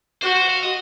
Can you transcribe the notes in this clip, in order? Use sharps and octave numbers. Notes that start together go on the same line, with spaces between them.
F#4 C5
C5
F5
D#5